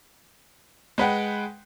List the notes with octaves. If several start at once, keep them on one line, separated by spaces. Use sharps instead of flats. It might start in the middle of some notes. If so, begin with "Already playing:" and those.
G#3 B4 F#5 G5